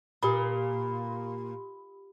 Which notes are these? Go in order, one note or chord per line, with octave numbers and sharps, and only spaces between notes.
A#2 G4 B5